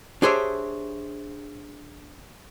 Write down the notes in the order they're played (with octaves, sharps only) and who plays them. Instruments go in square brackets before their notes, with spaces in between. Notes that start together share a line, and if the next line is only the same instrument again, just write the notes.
[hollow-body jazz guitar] D4 G4 G#4 C5 C#5 E5